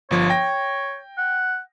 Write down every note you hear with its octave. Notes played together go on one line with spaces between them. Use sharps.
G1 F3 C#5
G5 A#6
F#5